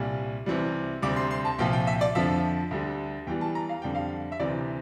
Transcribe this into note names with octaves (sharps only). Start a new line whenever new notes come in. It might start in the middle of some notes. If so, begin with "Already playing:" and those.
Already playing: C2 A#2 G3
C2 C3 E3 G3
D2 C3 G3 D6
C6
C6
A5
C2 A#2 F3 G5
G5
E5
D5
F2 D3 F3 E5
D2 D3 G3
E2 E3 G3 G5
A5
A#5
F5
F2 D3 G3 G5
F5
E5
D2 C3 E3 D5